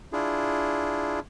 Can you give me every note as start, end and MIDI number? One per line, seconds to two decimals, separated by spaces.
0.13 1.20 62
0.13 1.20 64
0.13 1.20 65
0.13 1.20 68